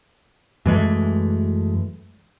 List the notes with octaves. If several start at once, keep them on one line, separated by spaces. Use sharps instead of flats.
F#2 E3 G#3 A3